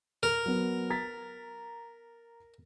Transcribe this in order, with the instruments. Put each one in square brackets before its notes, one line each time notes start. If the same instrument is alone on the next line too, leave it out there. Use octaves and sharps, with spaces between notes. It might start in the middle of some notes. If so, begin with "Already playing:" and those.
[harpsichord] A#4
[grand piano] F#3 B3
A#5 A6 B6